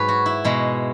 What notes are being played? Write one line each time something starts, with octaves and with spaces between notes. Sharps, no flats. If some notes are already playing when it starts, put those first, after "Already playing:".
Already playing: G#2 F#3 G#4 B4 C#5
F#4
E4
B2 G#3